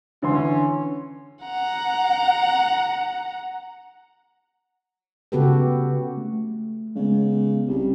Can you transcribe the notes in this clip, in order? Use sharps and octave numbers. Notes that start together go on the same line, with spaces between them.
D3 E3 C#4 C6
F#5 A#5
C#3 B3 F#4 G4 A4 B4
A3
C#3 G#3 B3
C2 G4